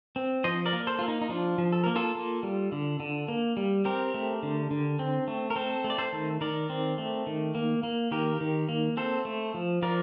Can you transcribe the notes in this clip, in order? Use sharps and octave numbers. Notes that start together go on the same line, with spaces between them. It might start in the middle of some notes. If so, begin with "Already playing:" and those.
C4
F3 C5 D#5
A#4 D5
A#3
A4 C5
A#3 F4
D#4
D#4
F3 D4 F4
F3
A4
A#3 A#4
F4 A4
A#3
G3
D3
D3
A#3
G3
C4 G4 A#4
A3
D3
D3
C4
A3
A#4
C4 A4 C5
A3
D5
A4 C5
D#3
D#3 A#4 D5
C4
A3
D#3
A#3
A#3
D#3 G4 A#4
D#3
A#3
C4 A4 C5
A3
F3
F3 A#4 D5